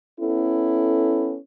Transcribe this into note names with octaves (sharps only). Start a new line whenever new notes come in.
B3 C#4 E4 A4